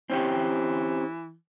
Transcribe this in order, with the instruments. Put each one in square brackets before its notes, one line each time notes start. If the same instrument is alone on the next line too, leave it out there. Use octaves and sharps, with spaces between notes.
[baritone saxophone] E3 [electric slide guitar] C4 C#4 G4